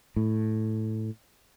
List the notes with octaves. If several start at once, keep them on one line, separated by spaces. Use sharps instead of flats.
A2